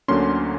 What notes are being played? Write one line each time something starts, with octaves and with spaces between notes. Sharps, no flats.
D2 D3 F#3 A#3 C#4 C6